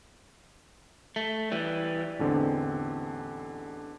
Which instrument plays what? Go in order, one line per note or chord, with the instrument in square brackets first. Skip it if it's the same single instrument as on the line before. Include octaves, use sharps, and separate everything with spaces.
[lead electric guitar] A3
E3 G3
[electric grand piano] A1 E2 D3 C4